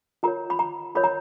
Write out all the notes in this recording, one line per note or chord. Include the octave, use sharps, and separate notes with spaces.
F4 A#4 C#5 A#5
B5
A#5
F4 A#4 C#5 B5
A#5